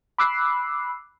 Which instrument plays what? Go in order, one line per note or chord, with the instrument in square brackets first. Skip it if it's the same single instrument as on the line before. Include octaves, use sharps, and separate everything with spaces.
[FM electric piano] B5 D6 E6 F#6 C7